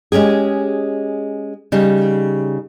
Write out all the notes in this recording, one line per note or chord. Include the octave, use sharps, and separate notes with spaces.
G#3 C#4 G4 G#4
C#3 G3 D#4